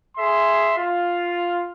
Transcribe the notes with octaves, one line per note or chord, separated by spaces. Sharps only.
G#4 E5 C6
F4